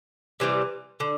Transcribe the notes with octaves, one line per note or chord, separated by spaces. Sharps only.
C3 E3 G3
D3